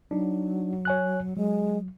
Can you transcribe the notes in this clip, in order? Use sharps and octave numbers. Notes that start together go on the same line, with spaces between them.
F#3 D4 D#4
C#5 G#5 F#6
F#3 G#3